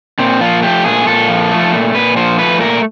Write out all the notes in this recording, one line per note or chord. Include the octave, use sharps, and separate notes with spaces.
A#2 C4
F3 F4
A3 G4
A#2 G#4
A#2 A4
F3
A3
A#2
A#2 B4
F3 C5
A3 B4
A#2 A#4